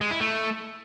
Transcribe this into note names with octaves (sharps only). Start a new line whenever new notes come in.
G#3
E4
A3